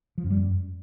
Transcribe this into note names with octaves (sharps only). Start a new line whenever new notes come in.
F3
F#2
G3
F#2